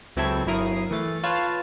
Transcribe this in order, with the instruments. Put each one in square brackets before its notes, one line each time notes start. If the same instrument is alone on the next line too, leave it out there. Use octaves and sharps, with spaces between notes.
[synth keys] C#2 F#3 C4 E4 A4 G#6
G1 F#3 E4 A#4 D#6 C7
E3 A3 A6
F4 B4 C#5 F5 A5